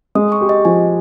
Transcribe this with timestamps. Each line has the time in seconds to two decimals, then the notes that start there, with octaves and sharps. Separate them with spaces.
0.15 G#3 D#6
0.32 C#6
0.41 G4
0.49 D#5
0.65 F3 G#5